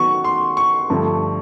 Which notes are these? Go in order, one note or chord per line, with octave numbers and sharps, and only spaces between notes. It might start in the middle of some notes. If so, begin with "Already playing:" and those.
Already playing: D#3 F#3 B3 C#6
C6
C#6
G2 D3 F3 A3 C4